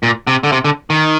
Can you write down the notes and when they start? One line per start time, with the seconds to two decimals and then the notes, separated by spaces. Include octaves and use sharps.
0.03 A#2
0.27 C3
0.44 D3
0.52 C3
0.65 D3
0.90 D#3